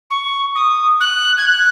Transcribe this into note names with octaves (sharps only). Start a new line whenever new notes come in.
C#6
D#6
F#6
G#6
F#6